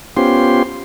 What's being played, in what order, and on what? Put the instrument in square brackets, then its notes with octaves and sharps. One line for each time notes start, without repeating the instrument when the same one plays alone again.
[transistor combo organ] B3 C#4 F4 G4 C5 C6